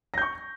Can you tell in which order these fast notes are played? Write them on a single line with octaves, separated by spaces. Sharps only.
A#6 G6 C#6